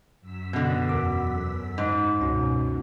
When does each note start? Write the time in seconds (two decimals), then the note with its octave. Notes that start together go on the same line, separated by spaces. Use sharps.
0.21 F#2 E6 B6
0.53 B2 D3
0.89 E2 A#4 D6
1.78 G#2 B5
2.19 C#2 F#2 B2 C#4 F#4